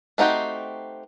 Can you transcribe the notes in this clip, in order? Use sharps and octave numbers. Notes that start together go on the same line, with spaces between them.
A3 C4 D#4 F#4 G4